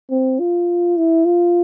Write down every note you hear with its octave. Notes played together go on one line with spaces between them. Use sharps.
C4
F4
E4
F4